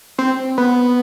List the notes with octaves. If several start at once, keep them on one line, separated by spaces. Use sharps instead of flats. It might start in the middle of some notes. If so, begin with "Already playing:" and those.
C4
B3